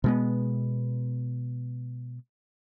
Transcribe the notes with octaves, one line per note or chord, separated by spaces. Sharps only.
B2 G#3 B3